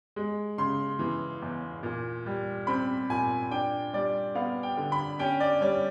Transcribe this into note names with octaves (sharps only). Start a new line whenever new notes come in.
G#3
C#3 C6
E3
E2
A#2
G3
C4 B5
A#2 G#5
D4 G5
G3 D5
B3 F5
G5
D3
B5
C#4 G5
D5
G3 C#5